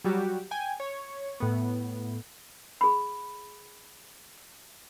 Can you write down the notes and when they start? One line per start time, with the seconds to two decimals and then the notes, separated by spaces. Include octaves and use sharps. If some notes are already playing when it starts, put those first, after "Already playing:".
0.04 F#3 G3 F#4 G4
0.51 G5 G#5
0.80 C#5
1.40 A2 B3
2.81 G#4 B5